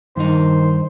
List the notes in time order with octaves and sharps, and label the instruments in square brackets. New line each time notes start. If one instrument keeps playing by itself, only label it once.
[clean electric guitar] G2 D#4 [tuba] D#3 [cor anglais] C5